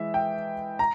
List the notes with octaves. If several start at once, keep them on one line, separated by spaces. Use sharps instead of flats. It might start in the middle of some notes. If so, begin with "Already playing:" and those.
Already playing: E3 G#3 E5
G5
A#5